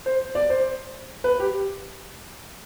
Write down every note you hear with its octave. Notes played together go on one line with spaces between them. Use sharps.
C5
D5
C5
B4
G4